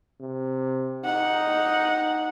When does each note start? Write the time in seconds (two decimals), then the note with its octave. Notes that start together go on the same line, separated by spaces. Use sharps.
0.21 C3
1.05 D#4 F#5